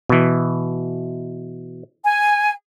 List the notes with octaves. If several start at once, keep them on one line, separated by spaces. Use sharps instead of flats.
B2 E3
G#5